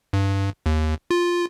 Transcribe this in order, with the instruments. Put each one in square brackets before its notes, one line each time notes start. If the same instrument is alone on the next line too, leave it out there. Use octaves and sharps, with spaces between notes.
[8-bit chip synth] G2
D#2
F4